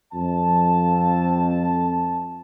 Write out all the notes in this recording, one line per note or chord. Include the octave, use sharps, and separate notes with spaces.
F2 A5